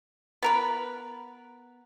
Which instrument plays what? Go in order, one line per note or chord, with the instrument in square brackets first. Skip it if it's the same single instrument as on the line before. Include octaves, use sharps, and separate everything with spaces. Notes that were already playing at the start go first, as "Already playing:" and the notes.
[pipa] B3 A#4 B4